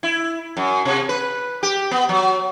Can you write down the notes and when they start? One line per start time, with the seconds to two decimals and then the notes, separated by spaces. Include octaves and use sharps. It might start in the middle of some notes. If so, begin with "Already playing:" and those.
0.03 E4
0.57 F#2
0.85 C3
1.09 B4
1.63 G4
1.91 B3
2.09 F#3